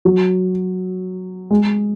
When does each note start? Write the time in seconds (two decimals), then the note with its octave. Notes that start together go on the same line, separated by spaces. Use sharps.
0.05 F#3
1.51 G#3